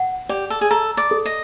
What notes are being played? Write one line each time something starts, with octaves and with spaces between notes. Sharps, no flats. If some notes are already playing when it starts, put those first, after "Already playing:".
Already playing: F#5
G4 D5
A4
G#4
A4 A#5
D5
A4
D#5